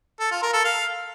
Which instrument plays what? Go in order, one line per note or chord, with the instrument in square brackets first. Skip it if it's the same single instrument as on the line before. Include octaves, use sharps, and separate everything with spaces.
[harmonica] A4
F4
A#4
A4
F5